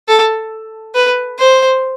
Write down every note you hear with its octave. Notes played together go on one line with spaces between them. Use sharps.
A4
B4
C5